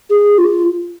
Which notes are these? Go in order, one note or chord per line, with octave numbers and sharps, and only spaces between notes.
G#4
F4